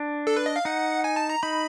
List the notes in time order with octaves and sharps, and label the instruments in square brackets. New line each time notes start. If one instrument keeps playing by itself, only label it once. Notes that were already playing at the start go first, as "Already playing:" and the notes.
Already playing: [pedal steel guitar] D4
[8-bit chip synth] A4
B4
D#5
F5
[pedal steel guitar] D#4 [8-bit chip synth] F#5
[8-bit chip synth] G#5
A5
A#5
[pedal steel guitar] D#4 [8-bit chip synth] B5